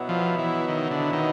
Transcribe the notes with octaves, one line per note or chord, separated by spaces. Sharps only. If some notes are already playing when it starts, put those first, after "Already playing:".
Already playing: B2 F#3 B3 E4
F3
E3
D#3
D3
D#3